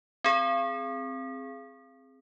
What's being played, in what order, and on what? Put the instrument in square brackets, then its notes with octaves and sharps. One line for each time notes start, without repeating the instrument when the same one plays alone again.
[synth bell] C4 G#4